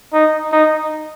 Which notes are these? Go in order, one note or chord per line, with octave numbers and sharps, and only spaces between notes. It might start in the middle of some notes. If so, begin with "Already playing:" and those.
D#4
D#4